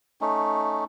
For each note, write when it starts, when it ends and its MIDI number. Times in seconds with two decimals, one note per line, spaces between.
0.21 0.84 57
0.21 0.84 61
0.21 0.84 63